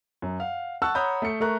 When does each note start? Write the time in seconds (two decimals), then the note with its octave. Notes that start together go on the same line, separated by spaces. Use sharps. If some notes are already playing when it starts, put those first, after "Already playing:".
0.22 F#2
0.39 F5 F#5
0.82 F#5 A5 C#6 E6 F#6
0.95 C#5 F#5 A#5 B5 D#6 G6
1.22 A3 C#7
1.41 A3 A#4 C#6 F#6